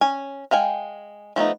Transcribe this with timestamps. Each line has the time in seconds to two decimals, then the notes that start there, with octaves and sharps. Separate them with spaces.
0.01 C#4 G#5
0.51 G#3 F5 G5 G#5
1.36 F3 A3 B3 D#4